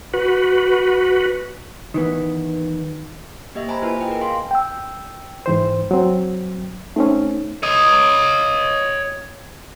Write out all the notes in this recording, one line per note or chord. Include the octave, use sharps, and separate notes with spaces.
F#4 B4
D#3 E3 B3
A#3 G4 D#5 E5
C5 G#5 A#5 B5
A#3 E4 F4 B4 G#5
D#5 G5
G#4 A#4
G#4 F5 C6
G5 E6
G#2 E3 C5
F#3 C4
A3 C4 C#4 D#4
C#5 D#5